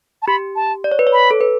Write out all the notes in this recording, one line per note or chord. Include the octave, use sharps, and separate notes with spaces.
A5
G4 B5
A5
D5
C#5
B4
C#5
B5
A4
B4